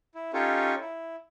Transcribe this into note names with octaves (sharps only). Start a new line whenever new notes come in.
E4
C#4 D#4 F4 G4 A4 C#5
E4